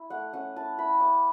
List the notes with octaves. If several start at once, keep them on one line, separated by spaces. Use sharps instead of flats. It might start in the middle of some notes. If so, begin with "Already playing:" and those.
Already playing: E4
A3 F#5
C#4 F#5
E4 A5
E4 B5
E4 D6